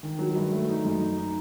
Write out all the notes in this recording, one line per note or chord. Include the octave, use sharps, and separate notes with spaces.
D#3
F#3
G2
A3
D#4
F#2
D#4
D#4